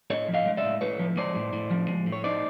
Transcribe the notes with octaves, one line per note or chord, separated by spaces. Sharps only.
A2 C#5 D#5
F3
D#5 F5
G#3
D5 E5
A2
A2 B4 C#5
F3
G#3 C5 D5
A2
A2
F3
G#3
A2
C#5
D#4 C5 D5